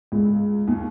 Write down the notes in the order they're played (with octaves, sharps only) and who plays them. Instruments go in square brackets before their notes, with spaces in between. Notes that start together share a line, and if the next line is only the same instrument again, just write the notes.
[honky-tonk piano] C#2
D#2